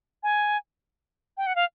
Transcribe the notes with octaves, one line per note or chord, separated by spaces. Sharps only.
G#5
G5
F#5
F5